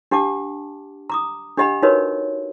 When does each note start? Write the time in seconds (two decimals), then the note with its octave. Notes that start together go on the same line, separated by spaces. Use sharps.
0.11 D4 G4 F#5 A5 D6
1.10 A#5 D6 D#6
1.57 D4 G4 D#5 F#5 B5
1.82 D#4 F#4 A#4 B4 C#5 D#5